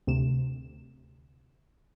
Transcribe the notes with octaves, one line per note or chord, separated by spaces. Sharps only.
D2 C3 E7